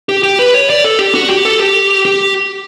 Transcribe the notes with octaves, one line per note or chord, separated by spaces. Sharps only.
G4
G4
B4
C#5
D5
A4
G4
F#4
G4
A4
G4
G4